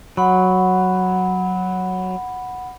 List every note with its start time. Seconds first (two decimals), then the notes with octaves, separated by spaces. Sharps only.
0.17 F#3 F#5 B5